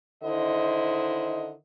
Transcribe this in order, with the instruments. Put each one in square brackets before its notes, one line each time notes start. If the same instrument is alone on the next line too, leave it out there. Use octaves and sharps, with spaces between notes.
[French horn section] D3 D#3 E4 C5 D#5